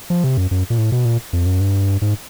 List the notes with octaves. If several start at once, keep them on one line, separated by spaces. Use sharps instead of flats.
F3
C3
F#2
F#2
A#2
A2
B2
A#2
F2
F#2
G2
G#2